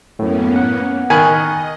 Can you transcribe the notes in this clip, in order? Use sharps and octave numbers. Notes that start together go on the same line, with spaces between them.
F#2 A2 A#3 B3 C#4
F#5
D#3 A#4 D#5 G#5 B5 C#6 F#6